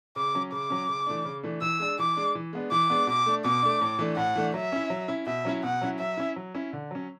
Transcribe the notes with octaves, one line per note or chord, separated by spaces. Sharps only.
C#3 D6
F#3 C#4
C#3 D6
F#3 C#4
C#3
E3 A3 D4
C#3
E3 A3 D4
E3 E6
G#3 D4
E3 D6
G#3 D4
E3
G#3 B3 D4
E3 D6
G#3 B3 D4
B2 D6
A3 D4
B2 D6
A3 D4
A2
E3 A3 D4
A2 F#5
E3 A3 D4
F#3 E5
C#4 E4
F#3
C#4 E4
B2 E5
F#3 C#4 E4
B2 F#5
F#3 C#4 E4
F#3 E5
C#4 E4
F#3
C#4 E4
D3
F#3 C#4